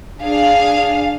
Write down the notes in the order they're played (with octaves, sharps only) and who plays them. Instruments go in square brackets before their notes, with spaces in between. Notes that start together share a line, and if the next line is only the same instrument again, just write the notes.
[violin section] D4 G#4 F5